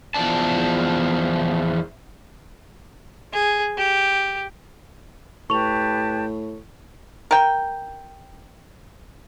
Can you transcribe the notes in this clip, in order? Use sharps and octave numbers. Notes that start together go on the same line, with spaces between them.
E2 F3 D5 A5
G#4
G4
A2 G4 B4 A5 C#6 F7
A#4 G5